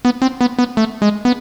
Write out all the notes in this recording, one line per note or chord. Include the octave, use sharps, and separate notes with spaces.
B3
C4
B3
B3
A3
G#3
B3